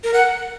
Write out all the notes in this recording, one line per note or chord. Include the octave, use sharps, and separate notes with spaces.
A#4
F#5